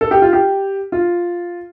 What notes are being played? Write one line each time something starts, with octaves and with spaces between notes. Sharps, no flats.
A4
G4
F4
G4
F4